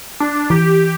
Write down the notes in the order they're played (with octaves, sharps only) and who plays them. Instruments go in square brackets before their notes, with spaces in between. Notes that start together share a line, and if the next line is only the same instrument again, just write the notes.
[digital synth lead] D4
[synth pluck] E3 [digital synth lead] G4